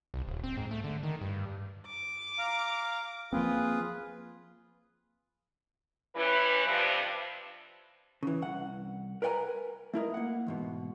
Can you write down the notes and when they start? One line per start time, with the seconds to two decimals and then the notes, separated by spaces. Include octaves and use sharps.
0.14 C2
0.28 D1
0.44 C4
0.57 G#2
0.71 A3
0.84 D3
1.03 D#3
1.21 G2
1.87 D6
2.38 F5 A#5
3.33 F3 A#3 C4 F4 G#4 B4
6.16 E3 G3 C#4 E4 B4
6.67 G2 C3 F3
8.23 C#3 E3
8.42 C2 F#5
9.22 A#4 B4 C#5 G5 G#5 A#5
9.94 A3 E4 A#4 D#5
10.14 A#3 F#5
10.47 E2 G#2 B2